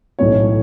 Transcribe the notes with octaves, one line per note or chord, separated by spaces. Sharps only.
B1 A2 E3 C#5